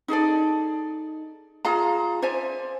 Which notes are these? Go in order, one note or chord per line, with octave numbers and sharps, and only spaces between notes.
D#4 G#4 A4 D5
F4 G#4 F5 A#5
C5 D5 E5 G#5